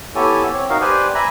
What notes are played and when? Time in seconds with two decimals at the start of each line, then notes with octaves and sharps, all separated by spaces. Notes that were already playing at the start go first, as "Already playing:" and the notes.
0.15 B3 E4 G4 A4 C#5 G#5
0.53 C4 C#5
0.70 D#4 F#4 A#4 F5
0.81 G4 B4 C5 D5 G5 G#5
1.15 E5 G#5 A#5 B5